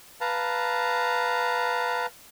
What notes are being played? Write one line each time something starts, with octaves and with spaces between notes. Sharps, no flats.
B4 F5 A5 A#5